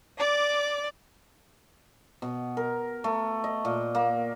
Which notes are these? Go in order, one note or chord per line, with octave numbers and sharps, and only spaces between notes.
D5 D6
B2
A#4
A3
D#5
A#2
A#3